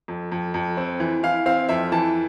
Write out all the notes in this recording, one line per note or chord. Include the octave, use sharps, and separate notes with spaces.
F2
F2
F2
C4
E3
E3 F5
C4 F5
F2 E5
E3 A5